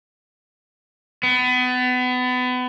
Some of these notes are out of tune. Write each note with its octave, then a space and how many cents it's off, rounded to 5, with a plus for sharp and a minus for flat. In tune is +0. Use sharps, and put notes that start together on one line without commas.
B3 +30